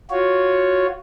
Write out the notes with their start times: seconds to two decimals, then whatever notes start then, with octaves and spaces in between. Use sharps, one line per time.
0.10 F4 F#4 C#5